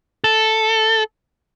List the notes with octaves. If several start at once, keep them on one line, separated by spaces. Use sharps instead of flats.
A4